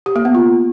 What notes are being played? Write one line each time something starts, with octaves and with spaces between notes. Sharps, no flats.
G4
A#3
B3
F4